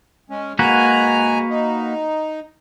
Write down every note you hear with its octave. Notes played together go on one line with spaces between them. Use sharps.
G#3 C#4
G#2 A#3 F#4 B4 G#5 A#5
D#4